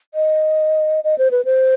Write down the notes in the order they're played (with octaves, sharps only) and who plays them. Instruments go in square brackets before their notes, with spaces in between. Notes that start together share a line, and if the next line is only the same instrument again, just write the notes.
[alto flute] D#5
D#5
C5
B4
C5